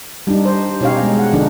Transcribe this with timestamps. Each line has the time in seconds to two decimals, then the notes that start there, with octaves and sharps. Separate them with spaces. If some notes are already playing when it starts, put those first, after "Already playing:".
0.27 G3 D4 D#4
0.45 C5
0.81 B2 C#4 D#4 G4 C#5 F5
1.03 G#3
1.19 F#5
1.33 D3 F3 D4 D#4